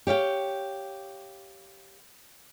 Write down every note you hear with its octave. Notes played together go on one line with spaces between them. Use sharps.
G4 C#5 F5 G5